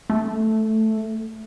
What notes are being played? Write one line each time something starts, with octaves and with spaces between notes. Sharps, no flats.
A3